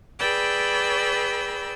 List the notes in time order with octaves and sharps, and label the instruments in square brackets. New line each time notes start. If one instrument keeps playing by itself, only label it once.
[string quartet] G#4 B4 D5 G5 B5 E6